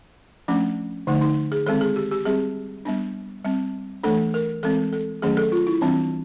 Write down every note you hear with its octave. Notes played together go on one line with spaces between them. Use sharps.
F3 A3 C#4 D4
D3 F3 A3 D#4
D#4
G#4
D#3 G#3 C4 A4
G#4
G4
G4
G3 C4 G#4
G3 B3 D4
G3 C4
E3 A3 D4 A4
A#4
E3 G#3 C4 A4
A4
D#3 F#3 A3 C#4 G#4
A4
F4
E4
E3 G3 C4 D4